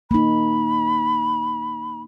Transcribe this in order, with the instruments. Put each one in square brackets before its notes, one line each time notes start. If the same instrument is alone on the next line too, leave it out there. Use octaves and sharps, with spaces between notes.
[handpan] A#3 D#4 [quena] B5